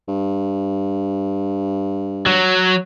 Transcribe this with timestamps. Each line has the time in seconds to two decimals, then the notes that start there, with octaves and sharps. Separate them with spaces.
0.08 G2
2.26 F#3